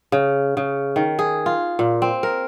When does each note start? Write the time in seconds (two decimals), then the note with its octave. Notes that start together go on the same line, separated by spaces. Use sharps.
0.12 C#3
0.57 C#3
0.96 D#3
1.19 G#4
1.46 F4
1.79 A#2
2.02 C4
2.23 A#4